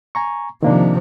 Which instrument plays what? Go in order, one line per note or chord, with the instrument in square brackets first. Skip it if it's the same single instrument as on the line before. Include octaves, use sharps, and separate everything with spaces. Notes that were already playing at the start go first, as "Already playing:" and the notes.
[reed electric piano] G#5 A#5 C#6
[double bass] C3 F3 [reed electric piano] D#3 A#3 D4